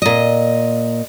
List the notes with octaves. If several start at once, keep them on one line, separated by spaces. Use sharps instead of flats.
A#2 D#5